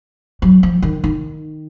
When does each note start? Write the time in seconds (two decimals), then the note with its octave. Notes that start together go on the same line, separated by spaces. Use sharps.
0.42 F#3
0.63 F3
0.82 D#3
1.04 D#3